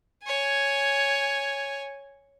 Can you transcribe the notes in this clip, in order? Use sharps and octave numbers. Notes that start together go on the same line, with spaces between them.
C#5 G#5